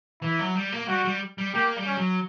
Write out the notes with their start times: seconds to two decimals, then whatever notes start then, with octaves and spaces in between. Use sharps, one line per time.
0.22 E3 E4
0.39 F#3
0.55 G3
0.72 A#3
0.88 G3 F#4
1.05 G3
1.38 G3
1.54 A#3 G4
1.76 G3
1.86 C#4
1.97 F#3